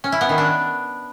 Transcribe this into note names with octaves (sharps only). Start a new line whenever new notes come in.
C#4
E4
B3
D#3
D4